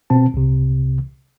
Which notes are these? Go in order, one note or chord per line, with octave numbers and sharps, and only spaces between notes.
B2 C4 A5
C2 C3